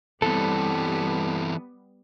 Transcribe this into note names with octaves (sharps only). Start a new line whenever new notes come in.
E3 G3 B3 C4 A4